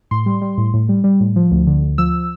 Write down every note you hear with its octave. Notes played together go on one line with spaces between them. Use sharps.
A2 C6
G3
G3
A2
A2
G3
G3
A2
F3
D2
D3
D2
F3 E6